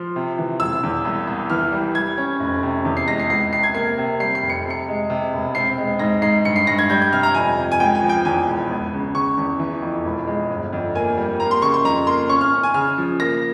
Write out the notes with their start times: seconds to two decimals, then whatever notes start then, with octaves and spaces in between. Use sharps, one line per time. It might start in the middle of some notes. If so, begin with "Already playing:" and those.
Already playing: F3 C6
0.16 C3
0.38 E3
0.60 E1 E6
0.83 E2
1.05 C2
1.27 C2
1.50 E3 F6
1.72 G3
1.95 G3 G#6
2.18 C#4
2.40 F1
2.63 C3
2.85 E2
2.97 C7
3.07 G#3 A#6
3.19 C7
3.30 C#2 C7
3.53 C3 C7
3.63 G#6
3.75 A#3 C7
3.98 C3
4.20 G3 C7
4.35 C7
4.42 F1
4.50 C#7
4.66 C3 C#7
4.88 G#3
5.10 C3
5.33 E1
5.55 C4 C7
5.78 G#3
5.99 G#2 A#6
6.22 G#2 C7
6.45 G2 C#7
6.56 C7
6.67 G2 A#6
6.79 G#6
6.90 G3 G6
7.02 G6
7.12 C3 F6
7.23 A#5
7.34 F2 G#5
7.58 F2
7.72 G#5
7.80 C#2 G5
7.95 G#5
8.03 F3
8.09 G5
8.25 E2 G#5
8.47 E1
8.71 C#2
8.93 C#3
9.14 C#3 C#6
9.37 E2
9.59 E3
9.82 F2
10.04 E1
10.27 G#3
10.50 G1
10.73 F2
10.95 A#3 G#5
11.17 G3
11.40 A#3 A#5
11.51 C6
11.62 C#3 C#6
11.74 C6
11.84 F2 A#5
12.07 A#3 C6
12.29 C#4 C#6
12.41 F6
12.53 C#4
12.63 G#5
12.74 C#3 F6
12.98 F3
13.20 A#3 A#6